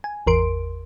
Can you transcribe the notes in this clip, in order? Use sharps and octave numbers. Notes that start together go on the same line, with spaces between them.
G#5
G#1 E2 A#4 C6 D7